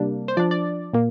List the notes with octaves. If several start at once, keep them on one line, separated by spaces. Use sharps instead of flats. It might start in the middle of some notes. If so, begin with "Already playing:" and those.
Already playing: C3 G3 A#3 D4
C5
F3 D4 D5
D5
A#2 A#3